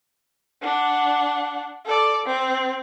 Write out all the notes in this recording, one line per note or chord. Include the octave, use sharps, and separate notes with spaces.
D4 F#5
A4 D5
C4